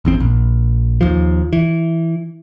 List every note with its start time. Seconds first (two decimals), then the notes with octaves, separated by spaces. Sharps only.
0.05 G#1 E2 C4
0.20 A#1
1.01 D#2 F3
1.53 E3